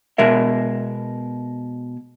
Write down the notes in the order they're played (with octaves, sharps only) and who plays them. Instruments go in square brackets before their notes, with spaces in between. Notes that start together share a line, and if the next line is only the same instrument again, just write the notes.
[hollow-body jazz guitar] B2 G#3 A#4 E5